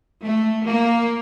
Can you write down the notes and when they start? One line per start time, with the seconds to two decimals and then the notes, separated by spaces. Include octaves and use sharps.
0.24 A3
0.67 A#3